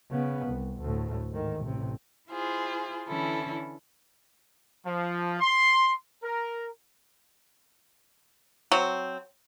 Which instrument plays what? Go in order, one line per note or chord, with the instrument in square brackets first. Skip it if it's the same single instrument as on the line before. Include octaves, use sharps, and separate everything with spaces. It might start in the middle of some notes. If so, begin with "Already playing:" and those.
[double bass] C#3 B3
C2
D2 A2
G#2 D#3
A1 C3
[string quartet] E4 F4 G#4 C5
D3 E3 C#4 E4 A4
[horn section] F3
C6
A#4
[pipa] F#3 C4